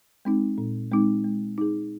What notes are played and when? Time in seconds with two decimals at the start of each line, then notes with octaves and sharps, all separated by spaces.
0.25 G#3 C4 D#4
0.58 A#2
0.92 G#3 C4 D#4
1.24 G#3
1.58 D#4 G#4